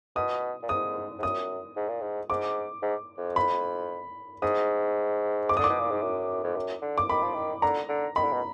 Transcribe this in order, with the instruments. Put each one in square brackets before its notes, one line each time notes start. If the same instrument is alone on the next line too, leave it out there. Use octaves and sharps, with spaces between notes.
[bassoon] B2 [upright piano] D#6
[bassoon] A#2
[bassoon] G#2 [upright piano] D#6
[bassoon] G#2
[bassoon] F#2 [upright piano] D#6
[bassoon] G#2
A#2
G#2
[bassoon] G#2 [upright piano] D6
[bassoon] G#2
F2
[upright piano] B5
[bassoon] G#2 [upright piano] D#6
[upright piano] D6
[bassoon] D3 [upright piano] D#6
[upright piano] D6
[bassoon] B2
A#2
G#2
F#2
F2
F#2
D3
[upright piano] D6
[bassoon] D#3 [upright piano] B5
[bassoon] F3
D#3
[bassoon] D3 [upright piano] A#5
[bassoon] D3
[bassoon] D#3 [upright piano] B5
[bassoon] D3
B2